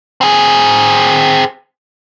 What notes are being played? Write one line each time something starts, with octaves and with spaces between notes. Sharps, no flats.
C4 G#4